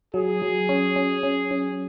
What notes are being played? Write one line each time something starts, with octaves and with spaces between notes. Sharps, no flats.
F#3 G#4
F#3
C#4
C#4
C#4
C#4